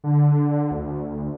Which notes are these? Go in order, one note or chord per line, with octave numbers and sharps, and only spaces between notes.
D3
D2